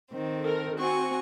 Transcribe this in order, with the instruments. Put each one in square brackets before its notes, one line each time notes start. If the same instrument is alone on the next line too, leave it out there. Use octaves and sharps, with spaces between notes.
[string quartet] D#3 C4
[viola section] A4 A#4
[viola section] C4 F#4 [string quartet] G#5 C#6